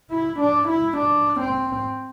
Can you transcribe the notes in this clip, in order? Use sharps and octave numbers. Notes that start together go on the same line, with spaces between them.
E4
D4
E4
D4
C4